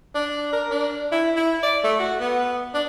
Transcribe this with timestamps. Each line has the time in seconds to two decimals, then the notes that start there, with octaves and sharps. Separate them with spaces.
0.15 D4
0.52 A#4
0.71 D4
1.12 E4
1.36 E4
1.63 D5
1.84 A3
2.00 F#4
2.20 B3
2.74 D4